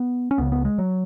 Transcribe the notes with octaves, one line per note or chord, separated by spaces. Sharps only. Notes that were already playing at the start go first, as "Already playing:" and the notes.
Already playing: B3
C#4
C#2 C#3 B3
B3
G#3
F#3